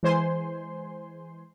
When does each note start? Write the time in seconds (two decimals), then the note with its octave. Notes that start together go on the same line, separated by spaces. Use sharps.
0.03 E3 G#3 C5 G#5 C6